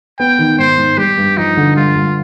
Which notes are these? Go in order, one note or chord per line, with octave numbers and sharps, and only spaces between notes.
B3 G5
D#3
G#2 C5
G#2
G3 G4
G2
F3 D#4
D3
G2 F4
G2